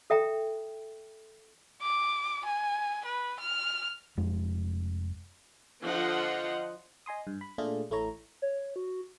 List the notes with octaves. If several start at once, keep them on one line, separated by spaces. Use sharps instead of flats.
A4 E5 G5 A#5
D6
G#5
B4
F6
F1 F2 G#3
D3 F3 F4 D#5 F#5
D#5 G#5 C6 D#6
G2
B5
A#2 A3 D4 F4 G#4
A1 A3 E4 C#5 A#5
C#5
F#4